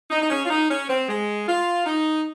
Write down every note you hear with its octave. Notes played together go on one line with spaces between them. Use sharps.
D#4
D#4
C#4
F4
D#4
C#4
C4
G#3
F4
D#4